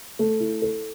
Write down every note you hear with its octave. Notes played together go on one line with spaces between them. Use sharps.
A3
E4
A4